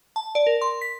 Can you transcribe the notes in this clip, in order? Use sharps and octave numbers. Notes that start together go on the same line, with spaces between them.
A5
D5
A#4
C6
B6